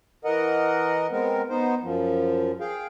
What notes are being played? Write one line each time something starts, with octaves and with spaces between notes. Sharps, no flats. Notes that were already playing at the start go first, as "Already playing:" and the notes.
E3 A#4 D#5 F#5
G#3 B3 C4 A#4
B3 D#4 C5
F#2 F3
G#4 F5 G5